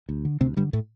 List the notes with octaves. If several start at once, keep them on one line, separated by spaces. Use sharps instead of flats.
D2
D3
D2 C3 C4
G2 D3 G3
A2 A3